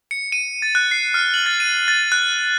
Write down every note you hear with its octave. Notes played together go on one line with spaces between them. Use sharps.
C#7
D#7
A6
F#6
C7
F6
F#7
A6
D#7
A6
F#6